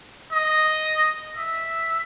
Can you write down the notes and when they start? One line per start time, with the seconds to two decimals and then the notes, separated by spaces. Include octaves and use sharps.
0.32 D#5
1.36 E5